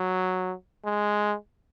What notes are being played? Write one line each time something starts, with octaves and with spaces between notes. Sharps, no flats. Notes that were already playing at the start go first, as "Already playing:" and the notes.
Already playing: F#3
G#3